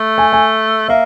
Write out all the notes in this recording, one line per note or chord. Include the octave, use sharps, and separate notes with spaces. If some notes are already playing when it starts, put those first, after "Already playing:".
Already playing: A3
G#5
G#5
A#3 E5